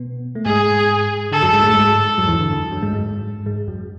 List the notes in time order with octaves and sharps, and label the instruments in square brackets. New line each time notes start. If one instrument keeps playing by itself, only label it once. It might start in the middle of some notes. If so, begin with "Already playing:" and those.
Already playing: [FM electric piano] B2 B3
A3
[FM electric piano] G#2 G#3 [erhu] G#4
[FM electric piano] D3 [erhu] A4
[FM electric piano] F#2 F#3
G#2 G#3
A2 A3
G#2 G#3
F#2 F#3
E2 E3
D3
D3
F#2 F#3
G#2 G#3
G#2 G#3
G#2 G#3
F#2 F#3